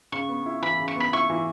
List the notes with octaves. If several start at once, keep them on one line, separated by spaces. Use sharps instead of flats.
C#3 C#6
B3
E4
E3 B5
C#3
C#6
B3 B5
E4 C#6
E3